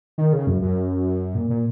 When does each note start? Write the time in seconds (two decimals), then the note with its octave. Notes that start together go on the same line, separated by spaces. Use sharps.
0.18 D#3
0.33 C#3
0.47 F#2
0.62 F#2
1.35 A#2
1.50 A#2